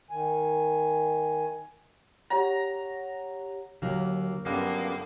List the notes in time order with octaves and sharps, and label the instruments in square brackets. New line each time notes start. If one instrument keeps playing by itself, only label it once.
[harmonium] D#3 G#5
[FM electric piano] G4 C#5 F#5 [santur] A#5
[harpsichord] D#2 A#3 B5 [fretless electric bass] D3 F#3
[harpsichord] G2 B3 D#5 [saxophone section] D3 F3 A#3 [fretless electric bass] F#3 [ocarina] C#4